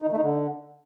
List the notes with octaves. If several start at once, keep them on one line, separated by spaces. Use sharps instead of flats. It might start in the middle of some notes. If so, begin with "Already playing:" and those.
D#4
D#3
A3
D#4
D3